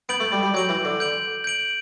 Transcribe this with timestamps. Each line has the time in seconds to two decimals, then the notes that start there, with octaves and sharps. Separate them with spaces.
0.09 B3 G6 D7 F#7
0.20 A3
0.32 G3
0.43 G3
0.54 F#3 G6 D7 F#7
0.69 E3
0.85 D3
1.00 G6 D7 F#7
1.44 G6 D7 F#7